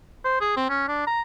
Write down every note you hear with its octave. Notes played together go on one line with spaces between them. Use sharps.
C5
G#4
C4
C#4
D4
A#5